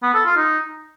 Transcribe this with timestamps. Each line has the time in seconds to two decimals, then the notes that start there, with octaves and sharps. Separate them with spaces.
0.03 B3
0.14 A4
0.25 F4
0.37 D#4